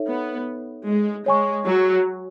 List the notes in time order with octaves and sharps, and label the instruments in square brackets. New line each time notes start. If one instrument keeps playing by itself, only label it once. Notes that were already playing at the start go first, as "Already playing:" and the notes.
Already playing: [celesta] D#4 A4 C#5 E5
[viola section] B3
G#3
[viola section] G#3 [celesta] C#5 G#5 C#6
[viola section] F#3